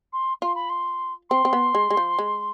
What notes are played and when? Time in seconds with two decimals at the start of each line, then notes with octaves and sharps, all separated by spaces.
0.13 C6
0.42 F4 C6
0.55 B5
0.69 C6
1.30 C4 C6
1.45 C4
1.53 B3
1.75 G#3
1.91 G#3
1.97 F3
2.19 G#3